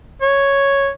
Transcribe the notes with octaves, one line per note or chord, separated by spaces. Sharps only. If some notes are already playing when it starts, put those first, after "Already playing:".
C#5